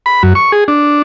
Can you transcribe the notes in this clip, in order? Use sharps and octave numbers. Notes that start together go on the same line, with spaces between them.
B5
F#2
C#6
G#4
D4